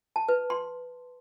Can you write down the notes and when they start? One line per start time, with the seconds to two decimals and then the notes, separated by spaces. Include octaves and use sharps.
0.16 A5
0.29 B4
0.50 C6